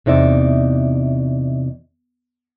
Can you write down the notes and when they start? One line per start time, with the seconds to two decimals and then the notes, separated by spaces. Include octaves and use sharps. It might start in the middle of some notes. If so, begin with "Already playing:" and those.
0.06 E2 C3 D#4 D5 E5